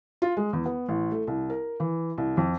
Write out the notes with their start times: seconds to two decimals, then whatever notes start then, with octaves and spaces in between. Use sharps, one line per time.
0.22 F4
0.37 G#3
0.53 E2
0.65 B3
0.89 A1
1.11 A3
1.27 C2
1.50 A#4
1.80 E3
2.18 C2
2.37 F2